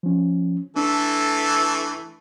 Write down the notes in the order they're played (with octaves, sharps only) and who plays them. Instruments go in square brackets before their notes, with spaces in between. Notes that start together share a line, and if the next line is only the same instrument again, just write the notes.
[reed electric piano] F3 C#4
[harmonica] E3 A3 A4 [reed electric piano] D4